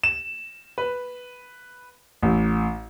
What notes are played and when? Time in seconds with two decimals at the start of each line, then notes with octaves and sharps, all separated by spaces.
0.03 E7
0.78 B4
2.22 A1